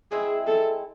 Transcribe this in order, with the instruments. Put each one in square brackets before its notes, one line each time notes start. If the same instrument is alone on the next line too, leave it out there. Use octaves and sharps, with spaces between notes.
[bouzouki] G#3 C4 E4 [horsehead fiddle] G#4
[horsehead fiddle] A4